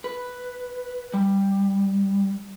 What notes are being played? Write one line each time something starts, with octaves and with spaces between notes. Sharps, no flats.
B4
G3